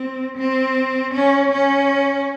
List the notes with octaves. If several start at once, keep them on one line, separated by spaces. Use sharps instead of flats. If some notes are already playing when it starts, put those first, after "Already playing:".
Already playing: C4
C4
C#4
C#4